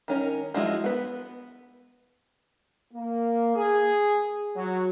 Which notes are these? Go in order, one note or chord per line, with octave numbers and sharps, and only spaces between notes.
D#3 C#4 A#4
F3 G#3 E4 F#4
B3 B4
A#3
G#4
F#3